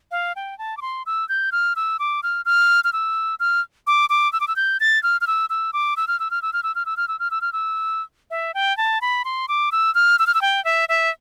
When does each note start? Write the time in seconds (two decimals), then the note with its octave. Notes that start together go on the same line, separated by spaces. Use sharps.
0.11 F5
0.36 G5
0.59 A5
0.77 D6
0.82 C6
1.06 E6
1.29 G6
1.52 F6
1.76 E6
1.99 D6
2.23 F6
2.45 F6
2.84 F6
2.93 E6
3.40 F6
3.87 D6
4.10 D6
4.33 E6
4.40 D6
4.48 E6
4.56 G6
4.80 A6
5.03 F6
5.21 F6
5.27 E6
5.50 E6
5.73 D6
5.97 E6
6.08 F6
6.20 E6
6.31 F6
6.42 E6
6.53 F6
6.63 E6
6.75 F6
6.86 E6
6.97 F6
7.08 E6
7.19 F6
7.31 E6
7.41 F6
7.53 E6
8.31 E5
8.54 G5
8.77 A5
9.02 B5
9.25 C6
9.48 D6
9.72 E6
9.95 F6
10.19 E6
10.27 F6
10.34 E6
10.42 G5
10.65 E5
10.89 E5